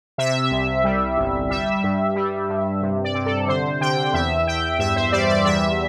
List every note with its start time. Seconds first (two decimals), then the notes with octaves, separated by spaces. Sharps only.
0.18 C3 E5
0.51 C2
0.84 G3
1.17 G1
1.50 G3 E5
1.83 G2
2.16 G3
2.49 G2
2.82 C3
3.04 D5
3.15 C3
3.26 A4
3.47 D3 C5
3.81 D3 G5
4.14 E2 E5
4.47 E2 G5
4.79 G2 E5
4.96 C5
5.12 G3 D5
5.29 D5
5.45 E2 E5